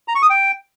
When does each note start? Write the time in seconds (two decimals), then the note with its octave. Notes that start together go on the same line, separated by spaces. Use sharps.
0.08 A#5
0.15 C#6
0.22 D#6
0.30 G5